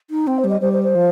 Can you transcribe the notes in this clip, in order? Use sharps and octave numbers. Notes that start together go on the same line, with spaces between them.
D#4
C4 G5
C5
G3
D#5
G3 C5
C5
C5
F3